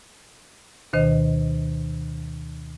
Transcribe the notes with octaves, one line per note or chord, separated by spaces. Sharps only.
D2 B2 D#3 C5 D#5